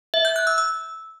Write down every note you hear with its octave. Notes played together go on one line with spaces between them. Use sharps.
E5
G6
F#6
E6
E6